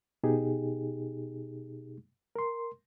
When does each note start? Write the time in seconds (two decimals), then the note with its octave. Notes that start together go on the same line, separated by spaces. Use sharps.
0.23 B2 D#4 G4 G#4
2.36 A#4 C6